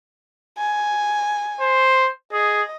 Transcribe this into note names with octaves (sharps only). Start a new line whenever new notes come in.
G#5
C5
G#4 D#5